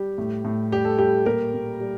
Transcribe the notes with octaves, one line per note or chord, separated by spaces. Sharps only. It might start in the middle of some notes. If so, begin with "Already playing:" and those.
Already playing: G3 G4
A2
A2
G3 G4
A4
G3 G4
A#2 G4 A#4
A#2
G3